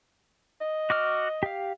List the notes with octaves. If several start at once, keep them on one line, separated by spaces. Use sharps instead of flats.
D#5
F#4 D6 F6
G4 F5